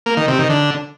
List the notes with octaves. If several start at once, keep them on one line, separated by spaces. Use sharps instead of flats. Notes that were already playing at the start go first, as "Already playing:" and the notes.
A#3
D#3
C3
D#3
D3